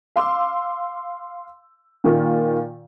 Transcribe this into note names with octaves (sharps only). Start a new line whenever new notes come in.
F5 C6 D6 E6
A#2 D#3 F4